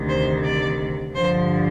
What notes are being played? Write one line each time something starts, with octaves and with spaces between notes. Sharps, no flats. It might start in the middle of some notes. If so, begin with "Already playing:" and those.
Already playing: D2 C3 D#3
C5
D5
G2 D3 F3 C5